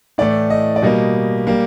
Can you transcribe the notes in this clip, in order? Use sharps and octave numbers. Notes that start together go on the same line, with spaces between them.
A2 E3 A3 D5
D#5
D5
B2 G3 A#3 D#5
G3 A#3